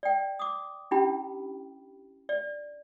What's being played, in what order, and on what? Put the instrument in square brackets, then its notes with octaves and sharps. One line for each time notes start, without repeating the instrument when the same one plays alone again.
[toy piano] D5 G5
D6 D#6
C#4 D4 E4 G4 G5 B5
D5